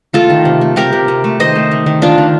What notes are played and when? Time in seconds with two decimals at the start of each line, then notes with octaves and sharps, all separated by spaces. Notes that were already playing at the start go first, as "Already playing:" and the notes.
0.13 A3 F4 A4
0.30 D#3
0.45 C3
0.61 A3
0.76 C3 G4 A#4
0.93 C3
1.08 C3
1.24 A3
1.40 D#3 C5 D#5
1.55 A3
1.71 D#3
1.86 D#3
2.02 D#3 D4 F4
2.18 D#3